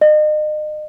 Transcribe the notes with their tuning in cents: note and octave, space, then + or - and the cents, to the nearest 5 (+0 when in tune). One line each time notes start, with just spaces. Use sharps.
D#5 -35